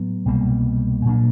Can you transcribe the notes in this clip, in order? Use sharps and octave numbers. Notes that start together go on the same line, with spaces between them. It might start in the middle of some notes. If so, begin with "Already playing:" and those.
Already playing: A2 F#3 B3
C2 B2 G3 A#3
A#2 F#3 A#3 D4